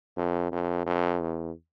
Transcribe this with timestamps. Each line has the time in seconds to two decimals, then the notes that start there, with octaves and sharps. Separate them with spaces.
0.17 F2
0.52 F2
0.86 F2
1.20 E2